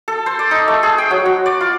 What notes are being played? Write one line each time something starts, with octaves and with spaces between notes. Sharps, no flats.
A4
C5
D5
D#4
A3
G#4
G5
F#3
F#4
D5
F4